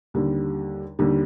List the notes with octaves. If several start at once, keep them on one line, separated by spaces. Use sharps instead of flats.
D#2 D3 G3
D#2 D3 G3